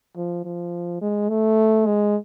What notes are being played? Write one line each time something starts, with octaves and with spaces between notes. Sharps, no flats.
F3
F3
G#3
A3
G#3